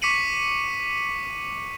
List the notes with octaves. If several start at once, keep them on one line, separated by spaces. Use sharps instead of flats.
C#6 D6 B6 C#7 D#7 F#7